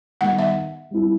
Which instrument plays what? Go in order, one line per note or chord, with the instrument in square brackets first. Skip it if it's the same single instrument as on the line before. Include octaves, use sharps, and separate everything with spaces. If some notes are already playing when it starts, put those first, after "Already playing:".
[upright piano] D#3 G3 B3 [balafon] F#5
[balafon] E5
[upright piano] G3 C4 E4